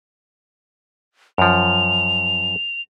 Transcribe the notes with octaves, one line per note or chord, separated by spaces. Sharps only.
F#2 F3 F7